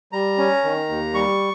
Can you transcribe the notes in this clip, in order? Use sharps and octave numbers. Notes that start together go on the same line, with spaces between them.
G3 A#5
C#4
D#3
D#2
G3 C#6